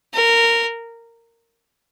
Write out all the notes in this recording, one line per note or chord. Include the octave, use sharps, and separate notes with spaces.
A#4